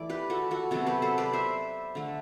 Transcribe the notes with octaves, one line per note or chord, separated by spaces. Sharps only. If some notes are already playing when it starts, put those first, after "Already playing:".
Already playing: E3 A3 D5
G4 B4
F#4 A4
F#4 A4
C3 F#3 B3 F#4 A4
G4 B4
A4 C5
B4 D5
C5 E5
D3 A3